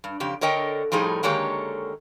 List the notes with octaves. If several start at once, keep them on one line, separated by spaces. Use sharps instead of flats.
G2
F2 C#3 G4
D3 A#4 C#5 D#5 G5
A2 F3 G3 D#4 G#4
D3 D#3 G#3 A#3 G4 C#5